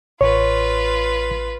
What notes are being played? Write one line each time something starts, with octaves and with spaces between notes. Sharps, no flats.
A1 F4 B4 C#5